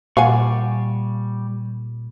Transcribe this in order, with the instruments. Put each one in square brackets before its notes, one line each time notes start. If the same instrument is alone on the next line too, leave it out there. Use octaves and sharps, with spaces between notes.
[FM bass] A#2 [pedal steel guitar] G3 C#6 [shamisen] F5 F#5 G#5